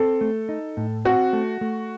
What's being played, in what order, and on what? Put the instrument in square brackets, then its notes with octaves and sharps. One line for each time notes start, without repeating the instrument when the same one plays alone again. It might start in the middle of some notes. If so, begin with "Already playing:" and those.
Already playing: [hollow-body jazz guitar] C4 [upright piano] A4
[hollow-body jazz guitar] A3
D#4
A2
[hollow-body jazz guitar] C4 [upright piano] F#4
[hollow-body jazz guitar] A3
A3